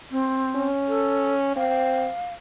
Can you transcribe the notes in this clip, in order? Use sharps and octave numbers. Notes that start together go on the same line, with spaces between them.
C4
C#4
A4
C4 F5